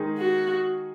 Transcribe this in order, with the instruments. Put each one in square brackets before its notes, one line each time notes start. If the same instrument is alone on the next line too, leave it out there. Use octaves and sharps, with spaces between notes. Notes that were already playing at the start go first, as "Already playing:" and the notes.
Already playing: [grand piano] D#3 G#3 D#4 G#4
[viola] F#4